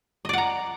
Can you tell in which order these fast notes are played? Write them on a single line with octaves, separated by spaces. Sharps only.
D#5 D5 F#5 A#5